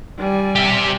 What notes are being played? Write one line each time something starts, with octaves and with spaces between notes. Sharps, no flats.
G3 G#5
G4 E5